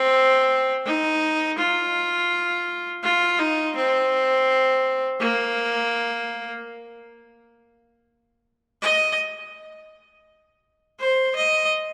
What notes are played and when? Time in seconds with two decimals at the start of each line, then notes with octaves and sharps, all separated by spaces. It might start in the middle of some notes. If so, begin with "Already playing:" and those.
Already playing: C4
0.86 D#4
1.58 F4
3.03 F4
3.39 D#4
3.75 C4
5.20 A#3
8.82 D#5
10.99 C5
11.35 D#5